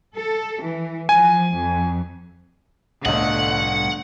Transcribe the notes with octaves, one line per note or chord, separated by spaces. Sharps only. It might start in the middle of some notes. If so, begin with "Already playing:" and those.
A4
E3
F3 G#5
F2
G1 C2 A2 D3 G3 A3 D#5 F#5